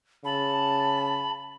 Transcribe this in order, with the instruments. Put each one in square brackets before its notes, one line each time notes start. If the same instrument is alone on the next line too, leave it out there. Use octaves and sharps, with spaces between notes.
[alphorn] C#3 [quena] A5 [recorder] B5